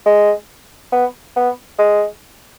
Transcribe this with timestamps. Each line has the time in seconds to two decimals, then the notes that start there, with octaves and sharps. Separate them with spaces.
0.06 G#3
0.92 B3
1.36 B3
1.78 G#3